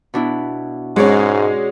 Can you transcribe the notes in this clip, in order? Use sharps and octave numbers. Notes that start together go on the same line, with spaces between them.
B2 D4 E4
G#2 G#3 C#4 F#4 C#5 D5